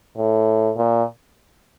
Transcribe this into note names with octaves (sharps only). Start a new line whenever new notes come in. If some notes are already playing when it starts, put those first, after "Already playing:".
A2
A#2